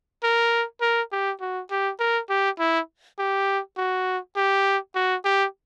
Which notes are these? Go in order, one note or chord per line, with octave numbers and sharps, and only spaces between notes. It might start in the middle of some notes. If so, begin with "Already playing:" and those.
A#4
A#4
G4
F#4
G4
A#4
G4
E4
G4
F#4
G4
F#4
G4